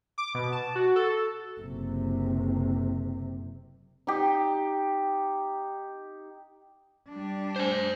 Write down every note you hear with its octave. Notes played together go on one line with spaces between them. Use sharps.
D6
B2
A5
F#4
A4
F#1 C3
D#4 G4
G3 D4
C5 G#5